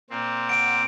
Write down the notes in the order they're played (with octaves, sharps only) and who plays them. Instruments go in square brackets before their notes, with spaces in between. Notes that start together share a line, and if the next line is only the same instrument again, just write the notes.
[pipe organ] A#2 C4
[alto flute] F#5 [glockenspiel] D7